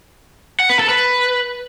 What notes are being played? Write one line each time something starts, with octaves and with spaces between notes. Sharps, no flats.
F#5
B4
A4
B4